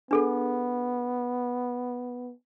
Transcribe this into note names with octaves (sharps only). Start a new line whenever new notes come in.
B3 D4 G#4 A4